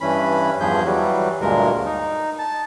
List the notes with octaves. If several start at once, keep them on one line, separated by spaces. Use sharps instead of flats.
G2 E3 C#4 B5
E2 G2 F3 G#4 G6
E3 F#3 G3
D2 G2 A#2 G#3 A#4
D#4
A5